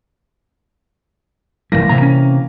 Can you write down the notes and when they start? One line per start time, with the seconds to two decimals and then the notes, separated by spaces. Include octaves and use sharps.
1.72 F1 B1 E3 G3 A#3 A#6
1.89 A2 C3 A#5
2.02 C#4